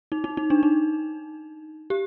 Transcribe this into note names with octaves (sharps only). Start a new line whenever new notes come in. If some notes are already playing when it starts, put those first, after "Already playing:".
D#4
D#4
D#4
D4
D#4
G4